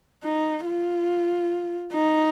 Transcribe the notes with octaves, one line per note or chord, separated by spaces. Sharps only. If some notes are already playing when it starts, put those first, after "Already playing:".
D#4
F4
D#4